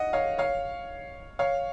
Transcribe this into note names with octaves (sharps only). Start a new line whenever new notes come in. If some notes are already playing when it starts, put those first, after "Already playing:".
Already playing: D#5 F#5
C#5 F5
C#5 F5
C#5 F5